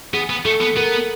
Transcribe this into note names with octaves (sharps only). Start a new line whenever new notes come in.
B3 G#4
B3
A3 A4
B3
B3 A#4